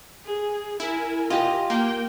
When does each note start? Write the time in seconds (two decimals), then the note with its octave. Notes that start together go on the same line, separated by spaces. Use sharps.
0.24 G#4
0.80 E4 A#4 G#5
1.30 F4 G4 D#5
1.70 A#3 G5